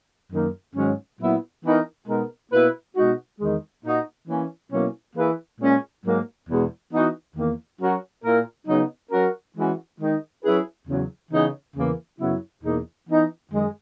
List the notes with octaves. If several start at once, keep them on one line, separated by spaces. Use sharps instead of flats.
F#2 D#3 A#3 D#4 A#4
G#2 D#3 F#3 C#4
A#2 F#3 B3 E4
E3 B3 D#4 A#4
B2 G#3 B3 D#4 A#4
B2 A#3 E4 B4
B2 G#3 D#4 F#4
E2 D#3 G#3
A#2 A#3 D#4 F#4
E3 A#3 C#4
B2 F#3 A#3 C#4 E4
E3 A#3 E4 G#4 B4
A#2 G#3 C#4
G#2 F#3 A#3
E2 B2 G#3
E3 B3 D#4 F#4
E2 D#3 A#3
F#3 C#4 F#4 A#4
A#2 A#3 E4 A#4
C#3 F#3 B3 D#4
F#3 C#4 F#4 A#4
E3 G#3 C#4 F#4
D#3 G#3 D#4
F#3 C#4 E4 G#4 B4
E2 C#3 F#3
C#3 E3 B3 D#4
E2 C#3 E3 A#3
F#2 C#3 F#3 B3 E4
E2 B2 A#3 D#4 G#4
E3 B3 D#4
F#2 D#3 G#3